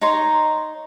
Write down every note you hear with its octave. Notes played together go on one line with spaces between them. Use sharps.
D#4 C#5 A#5 C6